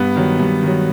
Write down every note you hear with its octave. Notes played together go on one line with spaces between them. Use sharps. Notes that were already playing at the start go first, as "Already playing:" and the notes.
Already playing: G2 B3
D#3 F#3
G2
D#3 F#3